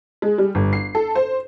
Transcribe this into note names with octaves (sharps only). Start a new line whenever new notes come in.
G#3
G3
G1
C7
A4
C5